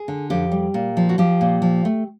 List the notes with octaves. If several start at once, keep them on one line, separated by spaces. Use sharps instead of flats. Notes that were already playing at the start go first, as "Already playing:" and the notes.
Already playing: G#4
D3
F2 G4
G3
A#2
F3
F#4
F3 G4
A#2
F3
A3